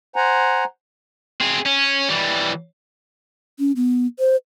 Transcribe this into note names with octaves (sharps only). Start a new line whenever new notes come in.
C5 F#5 G#5 A#5
C4 G#4
C#4
E3 G3
C#4
B3
C5